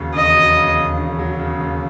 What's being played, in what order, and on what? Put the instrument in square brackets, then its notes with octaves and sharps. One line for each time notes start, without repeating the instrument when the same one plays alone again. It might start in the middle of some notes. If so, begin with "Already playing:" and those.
Already playing: [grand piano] D#2 C#3 F#3
[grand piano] E1 [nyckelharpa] D#5
[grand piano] F#3
C#3
D#2
E1
F#3
C#3
D#2